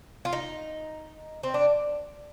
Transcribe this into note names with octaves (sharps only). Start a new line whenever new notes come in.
F4
D#4
C4
D4